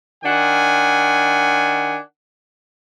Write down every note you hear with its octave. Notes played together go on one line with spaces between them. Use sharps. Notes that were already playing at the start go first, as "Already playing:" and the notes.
D#3 D4 F#5 G#5